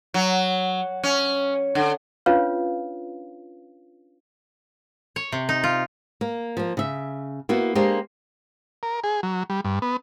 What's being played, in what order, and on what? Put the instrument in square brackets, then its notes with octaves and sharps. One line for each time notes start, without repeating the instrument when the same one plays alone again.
[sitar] F#3
C#4
D3
[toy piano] C#4 D4 F4 B4 C#5 F5
[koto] C#5
C3
D#4
F4
[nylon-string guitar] A#3
F3 A#3
C#3 E5
A#3 B3 E4 F#4
G#3 A#3 D4 G4 C5
[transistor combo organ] A#4
G#4
F#3
G3
G2
B3